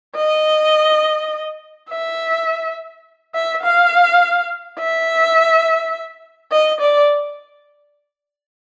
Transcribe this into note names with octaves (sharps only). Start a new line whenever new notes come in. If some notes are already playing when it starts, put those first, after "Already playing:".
D#5
E5
E5
F5
E5
D#5
D5